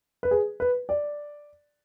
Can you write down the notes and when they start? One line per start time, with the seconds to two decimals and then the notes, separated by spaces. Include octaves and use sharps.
0.23 B4
0.31 G#4
0.60 B4
0.89 D5